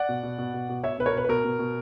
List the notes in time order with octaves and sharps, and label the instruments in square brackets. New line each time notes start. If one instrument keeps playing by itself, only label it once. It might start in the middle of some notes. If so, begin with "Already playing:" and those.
Already playing: [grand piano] D5 F#5
B2
B2
B2
B2
B2
B2 C#5 E5
B2 B4
A#4 C#5
B2 B4
B4
B2 A#4
B2
B2